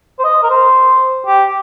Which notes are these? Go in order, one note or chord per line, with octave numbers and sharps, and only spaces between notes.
C5
D#5
A#4
C5
G4